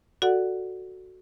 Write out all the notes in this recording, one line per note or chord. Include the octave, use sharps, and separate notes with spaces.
F#4 A4 D5 F#5